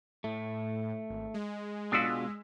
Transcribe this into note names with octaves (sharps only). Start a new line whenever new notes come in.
A2 A3
G#1
G#3
B2 D4 F4 F#4 D#6 E6 B6